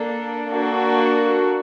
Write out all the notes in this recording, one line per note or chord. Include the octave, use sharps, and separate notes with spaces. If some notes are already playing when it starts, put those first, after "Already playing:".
Already playing: A#3 D4 A4
A#3 D4 F#4 A4